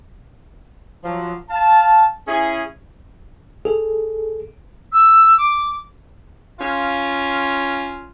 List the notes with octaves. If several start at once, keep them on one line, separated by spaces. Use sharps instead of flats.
F3 F#3
F5 A5
C#4 E4 G#4
G#4 A4
E6
D6
C#4 F4